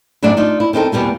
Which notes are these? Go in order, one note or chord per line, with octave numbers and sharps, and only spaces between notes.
F#2 A2 F#3 D4 F#4 D5
D4 D#4 F4
E4
D#3 C4 D#4 A4
E2 G#2 B2 G3 A#3